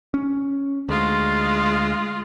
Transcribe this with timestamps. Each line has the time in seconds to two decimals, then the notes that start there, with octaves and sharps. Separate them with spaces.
0.14 C#4
0.89 D2 G#3 F4